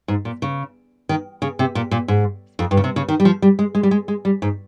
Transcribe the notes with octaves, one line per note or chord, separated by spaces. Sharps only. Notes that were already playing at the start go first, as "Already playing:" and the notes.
G#2
A#2
C#3
D#3
C#3
C3
A#2
A#2
G#2
F2
G2
C#3
C3
C#3
D#3
G3
F3
G3
G#3
G#3
G3
G#3
G#3
G3
G#2